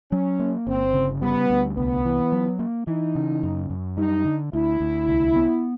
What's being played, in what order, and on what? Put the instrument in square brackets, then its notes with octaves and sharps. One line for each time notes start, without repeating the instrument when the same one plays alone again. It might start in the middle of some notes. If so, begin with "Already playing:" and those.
[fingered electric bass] F#3 [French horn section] C#4
[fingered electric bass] A#3
[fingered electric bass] G1 [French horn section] C4
[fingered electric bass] C#3
[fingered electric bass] G3 [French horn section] B3
[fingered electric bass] D2
[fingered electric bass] C2 [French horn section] B3
[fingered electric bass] E3
F#3
A#3
[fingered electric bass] E3 [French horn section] D#4
[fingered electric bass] C#3
F#2
F#2
[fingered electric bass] G3 [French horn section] D#4
[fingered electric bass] D3
[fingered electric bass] D2 [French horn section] E4
[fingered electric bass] D2
C2
B3